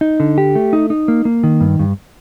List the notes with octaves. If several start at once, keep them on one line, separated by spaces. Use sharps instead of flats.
D#4
D3
G4
A3
D#4
D#4
A#3
A#3
D#3
G2
G2